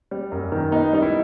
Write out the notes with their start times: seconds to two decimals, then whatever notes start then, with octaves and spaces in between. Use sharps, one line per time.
0.11 G3
0.32 F#2
0.52 D#3
0.72 B3 D#4
0.93 G3 D#4
1.02 E4